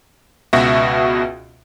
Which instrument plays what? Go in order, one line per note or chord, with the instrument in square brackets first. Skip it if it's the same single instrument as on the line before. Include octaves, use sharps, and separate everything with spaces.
[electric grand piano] C#2 B2 F#4 E5